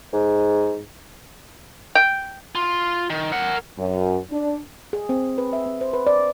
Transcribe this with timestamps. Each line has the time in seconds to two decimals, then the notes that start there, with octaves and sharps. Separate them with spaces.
0.13 G#2
1.95 G5
2.55 F4
3.10 D#3
3.32 A#4 F#5
3.78 F#2
4.31 D4
4.93 G#4
5.09 C4
5.38 B4
5.53 E5
5.66 C4
5.81 C5
5.93 B4
6.07 D5